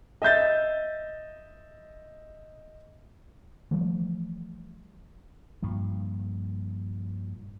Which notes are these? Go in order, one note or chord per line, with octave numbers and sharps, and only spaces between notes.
D#5 E5 G6 A6
E3 F3 G3 A3
G2 A#2 F3